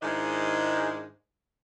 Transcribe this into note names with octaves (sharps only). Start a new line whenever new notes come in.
G#2 D#3 G#3 D4 E4 D#5